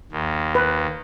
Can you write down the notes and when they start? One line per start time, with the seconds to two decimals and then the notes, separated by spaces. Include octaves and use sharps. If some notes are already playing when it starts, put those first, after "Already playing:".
0.12 D#2
0.55 B4